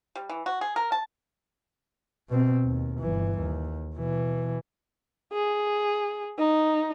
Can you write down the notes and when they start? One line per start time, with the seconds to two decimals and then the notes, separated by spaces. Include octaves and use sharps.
0.16 G3
0.29 E3
0.46 F#4
0.61 G#4
0.76 A#4
0.92 A5
2.29 B2 C4
2.64 D#2
2.99 G1 E3
3.39 D#2
3.95 B2 E3
5.33 G#4
6.38 D#4